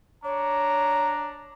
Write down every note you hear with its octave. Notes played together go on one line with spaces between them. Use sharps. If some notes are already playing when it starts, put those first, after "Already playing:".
D4 C#5 A#5